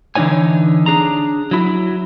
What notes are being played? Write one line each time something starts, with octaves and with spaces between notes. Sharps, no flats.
D3 E3 D4 D#4 C#5 G#5
D4 G#4 A#5
F#3 E4